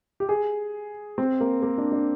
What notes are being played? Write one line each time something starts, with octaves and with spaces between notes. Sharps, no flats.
G4
G#4
C4
A#3
A#3
D4
D4